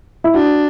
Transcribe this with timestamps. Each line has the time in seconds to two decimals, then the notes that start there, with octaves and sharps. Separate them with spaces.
0.24 E4
0.34 D4 F#4